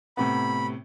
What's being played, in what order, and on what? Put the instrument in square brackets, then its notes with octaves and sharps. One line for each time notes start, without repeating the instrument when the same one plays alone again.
[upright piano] A2 C3 B3 [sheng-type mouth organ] B5